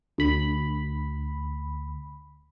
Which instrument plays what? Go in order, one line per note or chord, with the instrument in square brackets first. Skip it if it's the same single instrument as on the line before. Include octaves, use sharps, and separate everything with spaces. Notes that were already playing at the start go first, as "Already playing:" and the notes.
[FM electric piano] D2 B5